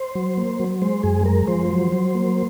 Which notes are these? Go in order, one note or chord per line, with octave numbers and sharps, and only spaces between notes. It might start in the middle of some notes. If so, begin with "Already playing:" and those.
Already playing: C5
F#3
A#3
F#3
G#3 C5
F#2 G#4
G#3 A#4
F3 C5
F#3
F#3
A#3